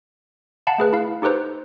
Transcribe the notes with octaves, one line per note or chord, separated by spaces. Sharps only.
F5 F#5 A5 B5
A3 G#4 B4
E4 F5
D#4 G4 A4 B4 C5